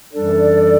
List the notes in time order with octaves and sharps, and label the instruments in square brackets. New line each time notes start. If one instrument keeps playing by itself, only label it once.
[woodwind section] F#2 E3 G3 D4 A4 [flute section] D5